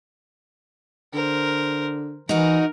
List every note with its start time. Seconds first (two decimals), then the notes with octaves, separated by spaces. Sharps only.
1.14 D3 A#4 C5
2.29 E3 D#4 F#4 A#4